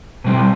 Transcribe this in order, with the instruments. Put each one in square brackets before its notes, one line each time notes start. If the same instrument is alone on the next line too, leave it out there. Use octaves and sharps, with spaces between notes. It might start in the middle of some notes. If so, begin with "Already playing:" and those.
[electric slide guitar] B2 G3 C4